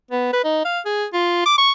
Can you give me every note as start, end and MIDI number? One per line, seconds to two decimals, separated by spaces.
0.11 0.33 59
0.33 0.42 71
0.44 0.60 63
0.65 0.80 77
0.86 1.06 68
1.13 1.45 65
1.46 1.57 86
1.58 1.72 85